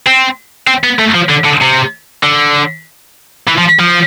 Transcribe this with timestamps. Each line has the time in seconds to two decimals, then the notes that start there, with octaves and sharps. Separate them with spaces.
0.07 C4
0.68 C4
0.84 B3
0.99 A3
1.15 F3
1.30 D3
1.45 D3
1.62 C3
2.23 D3
3.48 E3
3.58 F3
3.79 F3